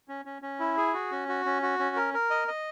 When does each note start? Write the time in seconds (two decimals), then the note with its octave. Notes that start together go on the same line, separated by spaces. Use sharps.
0.09 C#4
0.25 C#4
0.42 C#4
0.60 E4
0.77 G#4
0.93 F#4
1.11 C#4
1.28 F#4
1.45 C#4
1.62 F#4
1.79 C#4
1.96 A#4
2.14 A#4
2.30 D#5
2.48 D#5